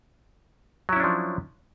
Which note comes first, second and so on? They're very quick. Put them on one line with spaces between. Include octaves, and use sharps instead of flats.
F#3 E4 C#4 D4 F3